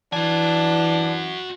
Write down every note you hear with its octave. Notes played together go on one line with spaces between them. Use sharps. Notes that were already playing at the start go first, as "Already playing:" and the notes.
E3 D4 F#4 G#5